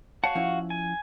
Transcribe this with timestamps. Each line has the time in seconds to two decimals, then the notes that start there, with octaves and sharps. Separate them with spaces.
0.24 F#4 C#5 F5 F#5 A5
0.35 F3 C#4 E4
0.70 G#5